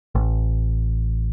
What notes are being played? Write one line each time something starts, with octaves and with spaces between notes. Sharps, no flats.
A1